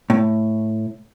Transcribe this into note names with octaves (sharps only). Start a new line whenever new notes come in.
A2